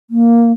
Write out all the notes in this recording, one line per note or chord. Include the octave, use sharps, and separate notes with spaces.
A#3